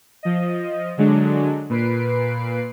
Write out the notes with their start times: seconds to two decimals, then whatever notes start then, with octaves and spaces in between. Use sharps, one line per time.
0.23 F3 D#5
0.97 D3 F#3 G#3 D4
1.70 A#2 B4 C7 D7